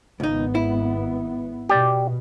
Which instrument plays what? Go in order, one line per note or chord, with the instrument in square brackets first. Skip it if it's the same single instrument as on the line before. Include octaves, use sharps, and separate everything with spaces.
[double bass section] G#1 B3 [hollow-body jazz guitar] C#2 D#4
[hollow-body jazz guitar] E4
[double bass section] B2 [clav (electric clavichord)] G4 D5